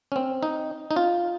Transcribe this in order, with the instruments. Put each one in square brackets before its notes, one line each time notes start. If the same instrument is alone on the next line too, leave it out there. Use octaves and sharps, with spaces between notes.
[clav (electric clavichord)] C#4
C4
D#4
D#4
F4